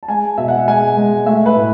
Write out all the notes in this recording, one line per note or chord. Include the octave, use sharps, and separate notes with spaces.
A5
G#3 G#5
B2 E5
F#5
G#3 G#5
G#3
A3 E5
B4
A2